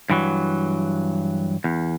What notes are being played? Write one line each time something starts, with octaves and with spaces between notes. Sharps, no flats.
G2 E3 F#3
E2